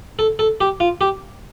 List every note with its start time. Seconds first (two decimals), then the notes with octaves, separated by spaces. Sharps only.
0.19 A4
0.39 A4
0.61 G4
0.80 F4
1.01 G4